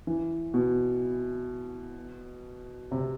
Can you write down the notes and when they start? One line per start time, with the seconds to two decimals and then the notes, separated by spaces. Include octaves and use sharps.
0.07 E3
0.54 B2
2.91 C3